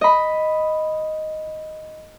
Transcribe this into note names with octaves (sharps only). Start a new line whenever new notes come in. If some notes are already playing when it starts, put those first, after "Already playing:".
D#5 B5